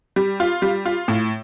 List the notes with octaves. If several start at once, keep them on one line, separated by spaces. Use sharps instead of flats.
G3
F4
G3
F4
A2